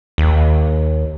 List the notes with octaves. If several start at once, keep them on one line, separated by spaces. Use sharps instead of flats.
D#2